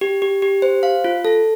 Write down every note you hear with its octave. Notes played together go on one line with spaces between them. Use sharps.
G4
G4
G4
C5
F5
F4
A4